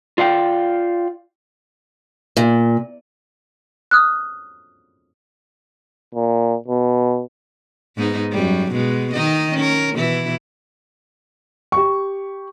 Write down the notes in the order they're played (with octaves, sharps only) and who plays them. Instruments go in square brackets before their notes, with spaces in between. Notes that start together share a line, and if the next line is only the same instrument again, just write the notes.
[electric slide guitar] F4 D5 F5 G5
[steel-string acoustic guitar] A#2
[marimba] D#6 F6 F#6
[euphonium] A#2
B2
[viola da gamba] G#2 B3 D#4
F#2 G3
B2 G#3
D#3 D#4 D#5
C#4 A#4
B2 E3 E4
[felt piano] G4 C#6